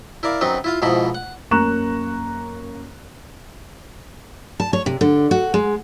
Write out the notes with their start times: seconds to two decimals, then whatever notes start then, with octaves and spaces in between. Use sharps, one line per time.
0.23 E4 A#4 D5 F5
0.41 F#2 F#3 C4 D#4 B4
0.64 E4 F4 F5
0.82 G#2 B2 F3 D#4 E4 B5
1.15 F#5
1.51 F#2 A#3 A#5 C#6 F#6 E7
4.60 A5
4.73 C#5
4.86 C3
5.01 D3
5.31 F#4
5.54 G#3